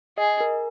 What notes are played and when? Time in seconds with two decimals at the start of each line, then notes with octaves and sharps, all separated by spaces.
0.18 G#4 D#5
0.41 A#4